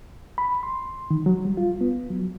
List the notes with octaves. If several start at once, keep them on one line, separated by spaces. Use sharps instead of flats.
B5
C6
D#3
F#3
G3
F4
B3
F#3